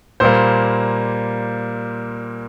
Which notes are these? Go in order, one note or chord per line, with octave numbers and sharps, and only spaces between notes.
A#2 G3 A#3 C5